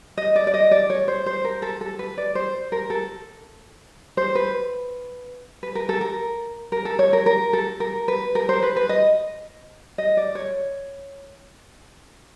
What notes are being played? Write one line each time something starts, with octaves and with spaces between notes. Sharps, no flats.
D#5
D5
D5
D#5
D5
C#5
C5
C5
A#4
A4
A4
B4
D5
C5
A#4
A4
C5
B4
B4
A#4
A4
A#4
A#4
A4
C#5
A#4
A#4
A4
A#4
B4
A#4
C5
B4
B4
D#5
D#5
D5
C#5